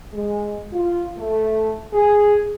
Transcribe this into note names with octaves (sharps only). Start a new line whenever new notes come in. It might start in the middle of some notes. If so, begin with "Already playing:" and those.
G#3
F4
A3
G#4